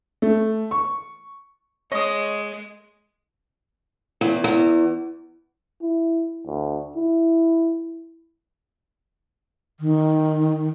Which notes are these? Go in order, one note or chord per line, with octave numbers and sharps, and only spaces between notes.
A3
C#6
G#3 C#5 D#5 D#6
E2
E2
E4
D2
E4
D#3